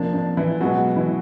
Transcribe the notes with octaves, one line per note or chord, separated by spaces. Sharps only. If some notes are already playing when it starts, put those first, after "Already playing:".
Already playing: F2 C3 F3 A#3 D4
D4
E3 E4
B2 F#3 G#3 B3 F#4
E3 E4